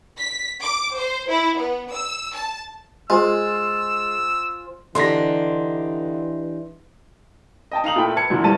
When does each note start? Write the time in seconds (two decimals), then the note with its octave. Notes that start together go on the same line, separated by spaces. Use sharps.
0.19 B6
0.62 D6
0.98 C5
1.29 E4
1.59 B3
1.93 E6
2.35 A5
3.10 G#3 F4 C5 G#5 E6
4.95 D3 E3 D4 D#4 G4 C6 A#6
7.72 D#5 G5 A5
7.84 D#4 F5 F7 F#7
7.96 A#2 A3 E4 G5
8.16 B4 A5 G#6 C#7
8.30 F#2 A#2 D3 E3
8.44 A#1 G2 G3 A5 A6 D#7